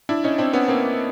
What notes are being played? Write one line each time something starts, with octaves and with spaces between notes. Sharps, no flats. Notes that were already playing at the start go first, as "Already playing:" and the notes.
D4 E4
C#4 D#4
C4 D4
B3 C#4
A#3 C4